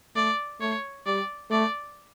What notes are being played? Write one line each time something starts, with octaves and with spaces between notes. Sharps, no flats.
A3 D5
A3 C#5
G3 D5
A3 D5